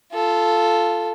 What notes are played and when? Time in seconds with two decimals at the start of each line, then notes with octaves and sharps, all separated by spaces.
0.13 F4 A4